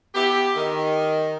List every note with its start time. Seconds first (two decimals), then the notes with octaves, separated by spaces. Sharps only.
0.15 B3 E4 G4
0.57 D#3